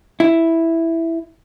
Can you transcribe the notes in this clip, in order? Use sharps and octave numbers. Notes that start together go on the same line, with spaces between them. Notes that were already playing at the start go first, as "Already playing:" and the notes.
E4